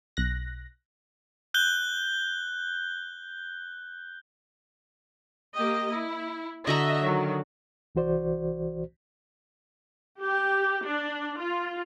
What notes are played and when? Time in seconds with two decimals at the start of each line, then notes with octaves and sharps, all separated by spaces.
0.17 B1 F#6 A#6
1.54 F#6 G6 G7
5.55 A#3 G4 D#5
5.90 E4
6.67 D3 F#4 D#5 E5 A#5
7.04 D#3 F#3
7.95 C2 E3 F#4 C5 D5
10.19 G4
10.83 D4
11.39 F4